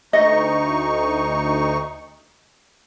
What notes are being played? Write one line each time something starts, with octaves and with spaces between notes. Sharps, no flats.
D2 D#4 D#5 C#6